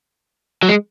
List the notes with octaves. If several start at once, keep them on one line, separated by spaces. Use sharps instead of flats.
F#3
G#3